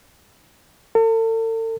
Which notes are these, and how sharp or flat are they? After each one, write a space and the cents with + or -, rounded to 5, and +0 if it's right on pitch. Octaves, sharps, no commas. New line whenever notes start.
A4 +40